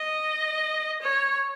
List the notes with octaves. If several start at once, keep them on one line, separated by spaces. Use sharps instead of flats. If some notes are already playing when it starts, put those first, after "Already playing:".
Already playing: D#5
C#5